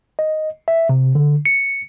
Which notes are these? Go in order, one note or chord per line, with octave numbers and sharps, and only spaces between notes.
D#5
E5
C3
D3
C#7